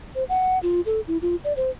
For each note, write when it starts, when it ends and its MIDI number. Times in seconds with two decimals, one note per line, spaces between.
0.15 0.24 72
0.29 0.59 78
0.63 0.81 65
0.86 1.00 69
1.08 1.18 64
1.22 1.36 65
1.44 1.53 74
1.57 1.70 72